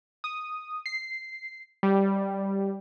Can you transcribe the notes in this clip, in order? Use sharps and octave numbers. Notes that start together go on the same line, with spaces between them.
D#6
C7
G3